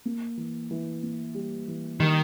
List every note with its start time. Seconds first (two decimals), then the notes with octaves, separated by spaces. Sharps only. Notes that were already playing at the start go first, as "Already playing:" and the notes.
0.05 A#3
0.37 E3
0.71 E3
1.03 A#3
1.35 G3
1.68 E3
2.00 D#3 G3